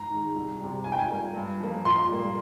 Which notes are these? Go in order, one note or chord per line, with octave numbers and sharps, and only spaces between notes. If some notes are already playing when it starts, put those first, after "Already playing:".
Already playing: G#2 A#5
D#3 G#3
C2
C3 G3
G#2 G#5
G5
G#5
G3 A#3
G2
F3 A#3
A#2 C6
G3 A#3